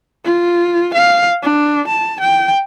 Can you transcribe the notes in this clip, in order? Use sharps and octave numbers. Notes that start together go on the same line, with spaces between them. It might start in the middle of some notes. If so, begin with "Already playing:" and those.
F4
F5
D4
A5
G5